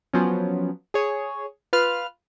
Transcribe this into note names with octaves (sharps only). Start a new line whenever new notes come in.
F3 F#3 B3 C#4
G#4 C#5
F4 B4 F5 F6